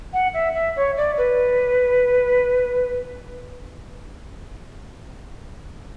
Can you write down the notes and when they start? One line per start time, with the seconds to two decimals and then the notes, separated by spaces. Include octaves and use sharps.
0.13 F#5
0.33 E5
0.54 E5
0.76 C#5
0.97 D5
1.17 B4